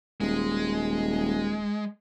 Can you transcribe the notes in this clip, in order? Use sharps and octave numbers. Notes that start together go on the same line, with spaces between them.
D#1 G#3